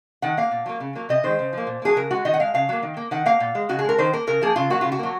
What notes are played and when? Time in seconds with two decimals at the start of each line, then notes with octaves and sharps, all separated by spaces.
0.22 D#3 F#5
0.37 A#3 F5
0.51 A#2
0.66 F#3 A#3
0.80 C#3
0.95 F#3 A#3
1.09 C3 D#5
1.23 D#3 G#3 C5
1.39 C#3
1.53 F3 A#3
1.67 A#2
1.82 F#3 A#3 G#4
1.96 C#3 A#4
2.11 G#3 F#4
2.25 D#3 D#5
2.34 F#5
2.40 G#3 F5
2.54 C#3 F5
2.69 F#3 A#3
2.83 D#3
2.97 A#3
3.11 D#3 F#5
3.26 A#3 F5
3.40 A#2
3.55 G#3
3.69 C#3 F#4
3.79 G#4
3.84 G#3 A#4
3.98 D#3 C5
4.13 A#3 A#4
4.27 C#3 A#4
4.41 F3 A#3 G#4
4.56 C#3 F4
4.70 F#3 A#3 F#4
4.81 C#3 F4
4.92 F#4
4.99 F#3 A#3